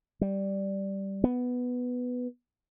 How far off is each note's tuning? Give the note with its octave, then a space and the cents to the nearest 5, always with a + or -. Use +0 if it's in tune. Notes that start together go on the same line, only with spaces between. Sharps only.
G3 -5
B3 +5